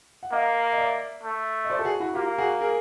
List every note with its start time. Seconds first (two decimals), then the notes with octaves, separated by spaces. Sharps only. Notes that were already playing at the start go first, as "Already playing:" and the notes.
0.23 F#5
0.32 A#3 D#5 F5
0.73 D#5
0.78 D5 E5
1.23 A3
1.65 D#5
1.70 C5 D5
1.79 A4
1.84 F#4 G#4
2.00 E4 F#4
2.15 A#3 F4 G4
2.38 F#4 G#4
2.61 G#4 A#4